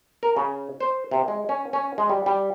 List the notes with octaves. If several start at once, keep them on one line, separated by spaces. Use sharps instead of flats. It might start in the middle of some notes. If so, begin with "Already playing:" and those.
A#4
C#3
C5
C3
G#3
C#4
C#4
G#3
G3
G3